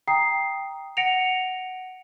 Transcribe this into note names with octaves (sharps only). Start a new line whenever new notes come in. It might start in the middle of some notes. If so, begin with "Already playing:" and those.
G5 A#5 D#6 C7
F#5 A#6 C#7 D7 F7